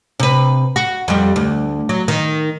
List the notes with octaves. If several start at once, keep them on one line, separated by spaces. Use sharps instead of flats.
C3 B4
F#4
F2 G3
D2
F#3
D#3